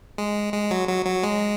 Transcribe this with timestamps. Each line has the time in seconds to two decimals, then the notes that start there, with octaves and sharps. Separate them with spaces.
0.18 G#3
0.53 G#3
0.71 F#3
0.88 F#3
1.06 F#3
1.23 G#3